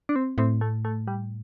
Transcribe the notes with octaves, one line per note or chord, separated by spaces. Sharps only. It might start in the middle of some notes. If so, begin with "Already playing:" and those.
D4
C4
A2 C4
A3
A3
G3